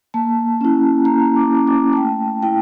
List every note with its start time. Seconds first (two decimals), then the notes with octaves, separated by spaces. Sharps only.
0.14 A#3 A5
0.61 C#4 E4
1.05 A#3 A#5
1.36 D6
1.52 C#4 E4
1.67 D6
1.93 A5
1.97 A3 G5
2.43 E4 G5